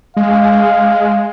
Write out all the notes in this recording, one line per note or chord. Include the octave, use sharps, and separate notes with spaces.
G#3 F5